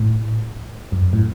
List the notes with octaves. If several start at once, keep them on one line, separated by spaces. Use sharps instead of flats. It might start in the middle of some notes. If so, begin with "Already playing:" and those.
Already playing: A2
F#2
A2